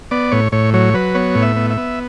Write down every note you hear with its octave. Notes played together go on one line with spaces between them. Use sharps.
B3 D5
A2 C#5
A2 C#5
F#3 C#5
F#3 B4
B3 C#5
A2
E5
B3
E5
B3